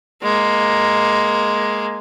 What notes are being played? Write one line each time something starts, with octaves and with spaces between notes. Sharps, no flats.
G#3 A#3